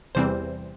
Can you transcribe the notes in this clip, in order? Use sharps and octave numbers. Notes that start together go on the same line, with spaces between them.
E2 C3 E3 G3 C4 C5